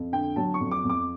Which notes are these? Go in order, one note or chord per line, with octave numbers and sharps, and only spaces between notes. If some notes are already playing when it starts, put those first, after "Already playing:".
Already playing: F2
D3 G5
F#3 A5
C#6
F2
D6
F2
D6